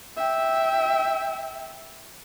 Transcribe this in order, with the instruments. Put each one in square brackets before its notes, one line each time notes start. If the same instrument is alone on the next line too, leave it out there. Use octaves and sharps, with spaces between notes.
[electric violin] E5 G5